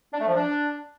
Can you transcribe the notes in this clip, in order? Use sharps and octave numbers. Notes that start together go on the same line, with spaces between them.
D4
A3
F3
D4